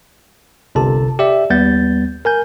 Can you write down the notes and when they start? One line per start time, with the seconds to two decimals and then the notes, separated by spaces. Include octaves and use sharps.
0.75 G1 C2 C3 A4 A5
1.19 G4 D5 E5
1.50 D#2 G3 B3 G6 A6
2.25 A#4 G#5 G6